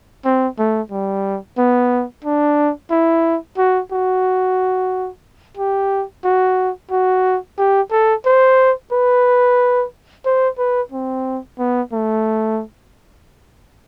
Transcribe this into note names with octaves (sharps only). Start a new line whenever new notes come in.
C4
A3
G3
B3
D4
E4
F#4
F#4
G4
F#4
F#4
G4
A4
C5
B4
C5
B4
C4
B3
A3